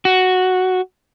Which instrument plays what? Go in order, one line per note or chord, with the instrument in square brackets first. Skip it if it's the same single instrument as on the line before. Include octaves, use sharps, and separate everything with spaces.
[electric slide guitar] F#4